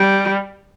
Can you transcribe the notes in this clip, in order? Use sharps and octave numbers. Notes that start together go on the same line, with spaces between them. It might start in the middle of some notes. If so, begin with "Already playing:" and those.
Already playing: G3